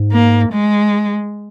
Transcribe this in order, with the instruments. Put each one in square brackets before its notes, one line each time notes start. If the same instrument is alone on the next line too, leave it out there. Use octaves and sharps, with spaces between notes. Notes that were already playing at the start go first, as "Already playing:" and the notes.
Already playing: [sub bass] G#2
[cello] A#3
G#3